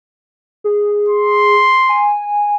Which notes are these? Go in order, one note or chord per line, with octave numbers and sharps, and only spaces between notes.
G#4
C6
G#5